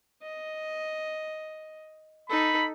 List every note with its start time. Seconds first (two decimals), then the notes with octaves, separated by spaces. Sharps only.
0.22 D#5
2.30 D#4 A4 B5